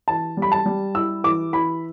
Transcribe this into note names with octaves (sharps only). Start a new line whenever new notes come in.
E3 A5
G3
B5
A5
G3
E4 E6
E3 D6
E3 B5